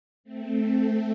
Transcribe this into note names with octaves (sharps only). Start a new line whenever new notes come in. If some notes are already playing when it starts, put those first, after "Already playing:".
A3 C4